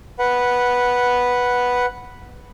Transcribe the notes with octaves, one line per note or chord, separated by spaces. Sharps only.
B4 F#5